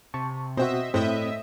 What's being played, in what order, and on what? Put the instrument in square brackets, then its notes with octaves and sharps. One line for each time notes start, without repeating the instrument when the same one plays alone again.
[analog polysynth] C3 [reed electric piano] A5 C#6
[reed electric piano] B2 C4 F#4 [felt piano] C5 [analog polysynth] D#5 E5
[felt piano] A2 [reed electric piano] C4 [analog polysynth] D#5 E5